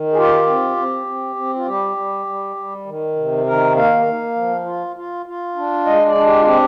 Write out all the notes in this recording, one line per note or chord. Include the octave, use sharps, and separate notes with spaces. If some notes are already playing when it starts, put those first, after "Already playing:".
Already playing: D#3
G#4
F4 G4
C4
C4
C4
C4
F4
G3 G4
G3
G3
G3
D#3
C3
D#3 A#4
A#3 F5
A#3
F3
F4
F4
F4
D4
G#3 D#5
D5
D4
G4
F4
C4 G4